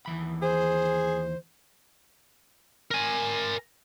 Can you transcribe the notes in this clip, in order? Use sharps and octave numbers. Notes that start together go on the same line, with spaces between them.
D#2 E3 B5
G#4 C5
A#4 G#5